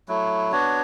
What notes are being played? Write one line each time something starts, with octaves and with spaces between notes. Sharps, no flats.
F#3 A3 E4
B3 D4 F#4 C#5